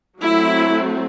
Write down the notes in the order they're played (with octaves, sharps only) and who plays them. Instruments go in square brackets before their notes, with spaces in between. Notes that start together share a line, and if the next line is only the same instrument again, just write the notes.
[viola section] F#3 A3 C4 E4